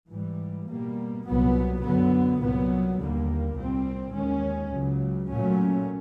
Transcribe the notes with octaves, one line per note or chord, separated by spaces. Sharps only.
G#2 E3 G3
B2 G3 A#3
C2 A#2 F#3 B3
F#2 D3 F#3 B3
C2 A#2 F#3 B3
D#2 D3 G3 A#3
C2 A#2 G3 C4
D#2 D#3 G#3 C#4
C#2 C#3 F#3
A#2 F#3 A3 C#4